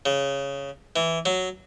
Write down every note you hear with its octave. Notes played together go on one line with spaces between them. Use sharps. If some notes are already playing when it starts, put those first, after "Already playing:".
C#3
E3
F#3